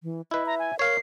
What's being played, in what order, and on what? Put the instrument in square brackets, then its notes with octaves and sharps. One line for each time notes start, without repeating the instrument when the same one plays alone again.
[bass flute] E3
[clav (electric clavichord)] E4 B4 [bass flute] D#5
[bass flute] E5 [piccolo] A#5
[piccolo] G#5
[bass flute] A#4 [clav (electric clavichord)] C#5 F5 [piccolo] C7